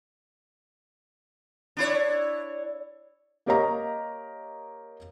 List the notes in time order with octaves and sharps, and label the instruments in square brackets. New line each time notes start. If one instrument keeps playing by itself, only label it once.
[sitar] D4 E4 C#5
[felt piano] A#3 G4 A#4 C#5 D#5 A#5